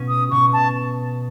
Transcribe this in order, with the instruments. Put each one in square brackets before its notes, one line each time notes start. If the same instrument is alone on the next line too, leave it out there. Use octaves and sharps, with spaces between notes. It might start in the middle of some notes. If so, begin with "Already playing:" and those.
Already playing: [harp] B2 C#4
[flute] D#6
[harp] B2 [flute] C#6
[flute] A5